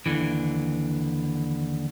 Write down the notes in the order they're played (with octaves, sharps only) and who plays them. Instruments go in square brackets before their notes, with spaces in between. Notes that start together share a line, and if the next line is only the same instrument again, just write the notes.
[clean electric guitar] D#2 D3 E3